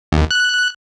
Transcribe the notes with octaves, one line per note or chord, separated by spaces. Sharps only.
D#2
F#6